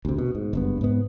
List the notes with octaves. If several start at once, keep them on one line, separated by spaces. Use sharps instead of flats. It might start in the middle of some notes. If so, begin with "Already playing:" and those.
D2 C3
B2
G#2
F#1 G2 B3
G#2 B3